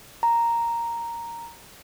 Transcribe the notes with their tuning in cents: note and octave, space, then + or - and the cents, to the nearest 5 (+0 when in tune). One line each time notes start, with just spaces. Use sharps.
A#5 -5